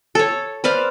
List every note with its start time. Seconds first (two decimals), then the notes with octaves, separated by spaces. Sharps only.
0.15 A4 C#5
0.64 B4 C5 D5 F5